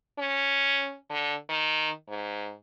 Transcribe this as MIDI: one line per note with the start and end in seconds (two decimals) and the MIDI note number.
0.18 0.97 61
1.10 1.35 50
1.49 1.90 51
2.08 2.53 44